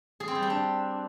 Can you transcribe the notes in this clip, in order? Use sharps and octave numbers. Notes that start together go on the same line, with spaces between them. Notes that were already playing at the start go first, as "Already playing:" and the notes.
G#4
C4
G3
G4
D4